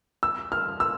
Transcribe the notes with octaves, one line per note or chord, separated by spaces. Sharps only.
E6
F6
E6